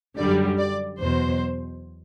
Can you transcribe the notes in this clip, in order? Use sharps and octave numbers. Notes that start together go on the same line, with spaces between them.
F#2 D3 G3 D5
D5
E2 B2 F#3 C5